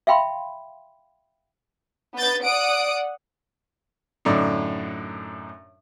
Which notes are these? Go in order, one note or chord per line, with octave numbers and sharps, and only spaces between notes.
E5 F5 G5 B5 C6
B3 B4 G6 A6
D5 F#5 D#6 D7
F#2 A2 D3 D4 D#4